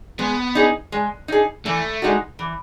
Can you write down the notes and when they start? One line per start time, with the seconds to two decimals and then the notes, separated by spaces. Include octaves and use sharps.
0.19 G#3 B3
0.55 D#4 G#4
0.92 G#3
1.28 D#4 G#4
1.65 E3 A3
2.02 G#3 D#4 F#4
2.39 E3